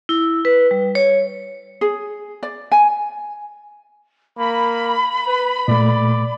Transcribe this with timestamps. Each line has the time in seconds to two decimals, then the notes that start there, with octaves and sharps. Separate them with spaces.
0.09 E4
0.45 B4
0.71 G3
0.95 C#5
1.81 G#4
2.43 D5
2.72 G#5
4.38 A#3 B5
5.27 B4
5.68 A#2 A3 D5